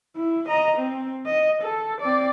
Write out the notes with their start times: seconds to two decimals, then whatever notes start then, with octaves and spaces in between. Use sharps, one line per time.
0.16 E4
0.48 D#5 A#5
0.77 C4
1.26 D#5
1.62 A4
2.00 C4 D5